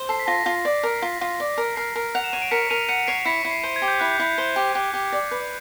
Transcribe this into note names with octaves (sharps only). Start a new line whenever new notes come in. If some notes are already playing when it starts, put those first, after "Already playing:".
Already playing: C5
A4 C7
B6
F4 A#6
F4
D5
A#4
C7
F4 B6
F4
D5
A#4
A#4 C7
A#4
F#5 F7
E7
C#5 D#7
D7
A#4 B6 C#7
A#4 D#7 F7
F#5 C#7 D#7
C#5 C7 D7
E4 B6 C#7
E4
C7
C5
G#6
G4
G6
E4 F#6
G6
E4
C5
G4
G4 F#6
G4
D5
B4